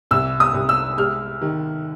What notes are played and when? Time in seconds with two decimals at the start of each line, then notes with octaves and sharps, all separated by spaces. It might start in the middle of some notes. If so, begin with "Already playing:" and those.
0.11 C2 E6
0.40 D#6
0.54 C2
0.69 E6
0.98 G#3 F6
1.41 D#3